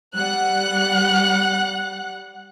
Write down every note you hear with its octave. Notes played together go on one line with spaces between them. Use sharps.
G3 F#5 F#6